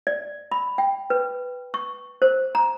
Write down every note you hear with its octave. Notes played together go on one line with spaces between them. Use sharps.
D5
B5
G5
B4
C#6
C5
A#5